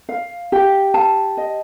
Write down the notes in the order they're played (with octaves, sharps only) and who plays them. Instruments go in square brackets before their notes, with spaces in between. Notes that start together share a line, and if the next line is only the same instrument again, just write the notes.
[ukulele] F5
G4
A5
D#5